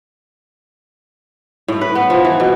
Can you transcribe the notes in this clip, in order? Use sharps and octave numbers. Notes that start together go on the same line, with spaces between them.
A2
B4
B3
F3
E3
B2